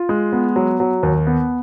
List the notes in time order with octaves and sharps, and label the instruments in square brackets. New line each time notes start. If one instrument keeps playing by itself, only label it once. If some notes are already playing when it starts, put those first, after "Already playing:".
Already playing: [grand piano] F4
G#3
B3
F#3
F#3
D#2
B3